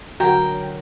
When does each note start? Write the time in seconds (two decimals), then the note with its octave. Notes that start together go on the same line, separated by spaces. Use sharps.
0.20 D3 F#3 F#4 A#4 F#5 G5 A#5